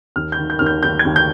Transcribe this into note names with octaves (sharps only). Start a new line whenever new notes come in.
D#2 F6
G6
D#3
G6
D#2 F6
G6
D#2 G6
G#6
D#2
G6